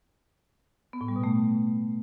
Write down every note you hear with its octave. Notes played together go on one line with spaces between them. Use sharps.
B3
A2
G3
B2
A3